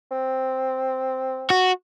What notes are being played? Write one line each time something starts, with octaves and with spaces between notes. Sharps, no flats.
C4
F#4